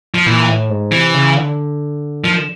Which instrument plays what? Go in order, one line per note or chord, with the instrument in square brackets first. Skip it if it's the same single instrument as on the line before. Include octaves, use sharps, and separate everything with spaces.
[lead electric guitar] F3
[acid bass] A#2 [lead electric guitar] E3
[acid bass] A2
G#2
[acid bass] C3 [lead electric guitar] E3
[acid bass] C#3
D3
[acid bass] D#3 [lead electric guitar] F3
[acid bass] D3